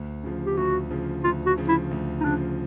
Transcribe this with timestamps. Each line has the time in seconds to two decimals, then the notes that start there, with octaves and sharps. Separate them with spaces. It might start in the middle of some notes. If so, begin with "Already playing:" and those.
Already playing: D2
0.23 C#3 F3
0.45 G4
0.57 D2 F#4
0.90 C#3 F3
1.24 D2 F4
1.46 F#4
1.57 C#3 F3
1.68 E4
1.91 D2
2.20 D#4
2.24 C#3 F3 D4